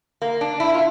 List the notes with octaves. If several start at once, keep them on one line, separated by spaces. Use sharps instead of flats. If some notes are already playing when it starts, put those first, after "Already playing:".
A#3
D4
E4
F4